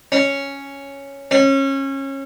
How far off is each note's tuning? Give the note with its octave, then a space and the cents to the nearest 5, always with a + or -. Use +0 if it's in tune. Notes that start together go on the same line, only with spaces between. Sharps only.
C#4 +0
C#4 -25